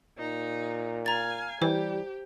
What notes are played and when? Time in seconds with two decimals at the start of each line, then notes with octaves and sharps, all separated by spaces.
0.18 A#2 D#4
1.06 F5 G#5 A#5 A6
1.62 E3 G3 G4 C5